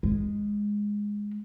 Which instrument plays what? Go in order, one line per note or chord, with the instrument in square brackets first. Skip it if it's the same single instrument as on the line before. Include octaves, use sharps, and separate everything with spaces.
[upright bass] G#3